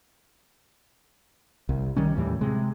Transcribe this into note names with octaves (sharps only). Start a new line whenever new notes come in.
C2
D#3 G3 C#4
D#2 A2 E3 G3
C3 G#3